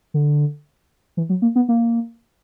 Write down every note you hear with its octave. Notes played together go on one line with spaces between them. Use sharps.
D3
E3
F#3
A#3
B3
A#3